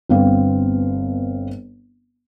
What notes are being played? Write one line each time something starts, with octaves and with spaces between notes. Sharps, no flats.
G1 B3 C4 F5